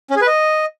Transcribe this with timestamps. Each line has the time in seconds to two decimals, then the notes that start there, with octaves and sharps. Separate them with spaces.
0.11 C#4
0.16 G#4
0.22 B4
0.27 D#5